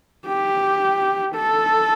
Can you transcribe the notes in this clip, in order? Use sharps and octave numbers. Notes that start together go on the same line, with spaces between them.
G4
A4